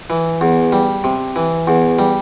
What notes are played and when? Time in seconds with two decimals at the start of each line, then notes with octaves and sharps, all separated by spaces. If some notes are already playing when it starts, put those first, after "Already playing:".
0.10 E3
0.41 E2
0.72 G3
1.04 C3
1.36 E3
1.67 E2
1.99 G3